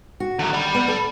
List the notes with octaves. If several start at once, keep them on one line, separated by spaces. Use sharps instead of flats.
F#4
D#2 D3 F#3
D5 B5
B3
A4